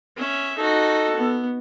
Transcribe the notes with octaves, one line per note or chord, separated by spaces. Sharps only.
C#4 E5
D#4 F#4 A4
B3